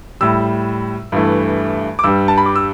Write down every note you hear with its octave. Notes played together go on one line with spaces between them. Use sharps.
A2 G3 E6
G2 E3 A3
D6
G2 G3 E6
A5
B5
D6
E6